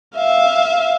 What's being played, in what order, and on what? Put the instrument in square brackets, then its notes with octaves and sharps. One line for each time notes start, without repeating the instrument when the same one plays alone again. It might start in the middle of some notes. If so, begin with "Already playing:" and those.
[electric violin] E5 F5